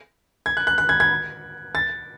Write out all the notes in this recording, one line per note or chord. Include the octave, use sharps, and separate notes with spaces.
G#6
F#6
F#6
F#6
G#6
G#6
A6